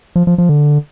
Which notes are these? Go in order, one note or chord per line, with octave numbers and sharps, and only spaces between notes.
F3
F3
F3
D3